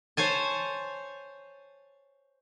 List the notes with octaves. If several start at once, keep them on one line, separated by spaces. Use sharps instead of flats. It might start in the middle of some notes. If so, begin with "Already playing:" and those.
C5 C#5 G#5 A5